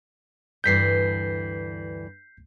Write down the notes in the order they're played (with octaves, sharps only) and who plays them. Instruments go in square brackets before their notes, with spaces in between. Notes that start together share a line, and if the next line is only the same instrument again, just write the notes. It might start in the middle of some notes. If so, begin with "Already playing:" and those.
[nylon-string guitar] D2 G2 E3 [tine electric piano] G6 B6 C7